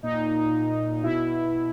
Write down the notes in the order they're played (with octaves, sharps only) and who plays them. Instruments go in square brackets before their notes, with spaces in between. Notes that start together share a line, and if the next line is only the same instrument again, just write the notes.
[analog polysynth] A#2 D#4
B2 E4